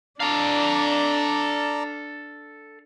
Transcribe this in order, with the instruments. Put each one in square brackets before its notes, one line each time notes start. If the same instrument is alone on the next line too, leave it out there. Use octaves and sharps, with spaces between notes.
[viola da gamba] D4 [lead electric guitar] A4 F5 [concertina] D5 A5 A#5